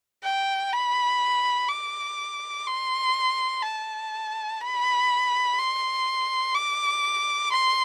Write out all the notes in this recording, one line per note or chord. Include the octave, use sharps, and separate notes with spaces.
G5
B5
D6
C6
A5
B5
C6
D6
C6